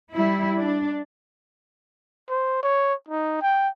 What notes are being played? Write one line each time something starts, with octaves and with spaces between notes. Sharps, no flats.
G3 E4
D4
C5
C#5
D#4
G5